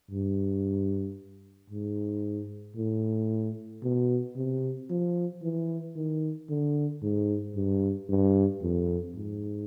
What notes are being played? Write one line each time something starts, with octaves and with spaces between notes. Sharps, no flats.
G2
G#2
A2
B2
C3
F3
E3
D#3
D3
G#2
G2
G2
F2
G#2